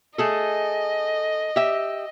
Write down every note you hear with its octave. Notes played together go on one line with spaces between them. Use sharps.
A3 G#4 A4 D#5
G4 E5